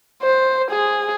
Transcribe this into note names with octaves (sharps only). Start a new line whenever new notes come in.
C5
G#4